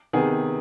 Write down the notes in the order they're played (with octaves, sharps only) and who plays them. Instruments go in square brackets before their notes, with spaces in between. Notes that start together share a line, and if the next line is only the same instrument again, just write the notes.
[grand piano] C3 D#3 B3 G#4